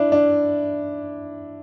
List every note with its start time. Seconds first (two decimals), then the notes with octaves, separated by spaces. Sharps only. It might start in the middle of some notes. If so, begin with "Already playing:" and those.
Already playing: D4 E4
0.12 D4